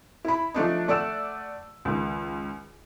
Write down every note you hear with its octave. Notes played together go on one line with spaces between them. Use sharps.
E4 B5
F3 A3 D4 D#4
A3 D5 F#5 E6 E7
C#2 D#3